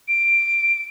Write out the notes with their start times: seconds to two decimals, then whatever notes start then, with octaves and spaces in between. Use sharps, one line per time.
0.08 D7